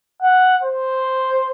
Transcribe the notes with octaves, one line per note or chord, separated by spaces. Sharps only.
F#5
C5